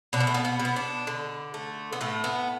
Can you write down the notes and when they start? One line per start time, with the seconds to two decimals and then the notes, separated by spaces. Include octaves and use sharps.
0.13 B2 D4
0.20 B3
0.27 A3
0.34 B3
0.45 B3
0.59 B2
0.65 B3
0.76 D4
1.07 D3
1.54 A3
1.93 B3
2.01 A2 A3
2.24 B3